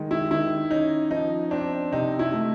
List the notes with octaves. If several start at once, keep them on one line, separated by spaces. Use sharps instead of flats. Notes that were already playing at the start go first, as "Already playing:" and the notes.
Already playing: D#3 G#3
E4
D#3 E4
C#4 D#4
F3 D#4
C4 D4
C3 D#4
E4
A3